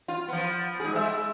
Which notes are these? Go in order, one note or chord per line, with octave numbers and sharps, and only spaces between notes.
F4
F3 B3
G#2 G#4
G#3 E5